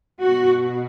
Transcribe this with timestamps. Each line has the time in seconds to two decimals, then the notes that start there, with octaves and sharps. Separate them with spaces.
0.23 B2 F#4